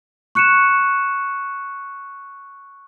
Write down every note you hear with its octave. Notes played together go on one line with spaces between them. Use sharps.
C#6 F#6 C#7 D#7 E7